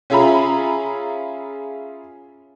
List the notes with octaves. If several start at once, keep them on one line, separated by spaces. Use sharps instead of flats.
C#4 F4 G#4 E5 A#5 B5